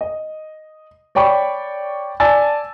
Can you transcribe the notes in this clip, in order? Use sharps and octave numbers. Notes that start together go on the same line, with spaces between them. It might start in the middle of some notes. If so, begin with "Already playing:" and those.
D#5
C#5 D5 G5 B5 C#6
D5 G#5 A5 E6 A6